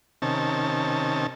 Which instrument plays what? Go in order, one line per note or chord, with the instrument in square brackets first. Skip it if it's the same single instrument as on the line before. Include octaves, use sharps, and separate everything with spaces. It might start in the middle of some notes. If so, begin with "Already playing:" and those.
[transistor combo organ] C3 D#3 C#4 A5